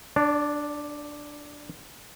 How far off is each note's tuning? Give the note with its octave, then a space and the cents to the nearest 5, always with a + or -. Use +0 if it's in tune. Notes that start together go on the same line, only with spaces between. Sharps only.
D4 +0 D5 -40